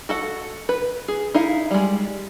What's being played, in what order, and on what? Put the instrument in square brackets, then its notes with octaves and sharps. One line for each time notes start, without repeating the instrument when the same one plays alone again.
[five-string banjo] F#4 A4 F#5
B4
G#4
D#4 E4 F5
G3 G#3